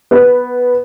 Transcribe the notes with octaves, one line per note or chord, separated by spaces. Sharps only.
B3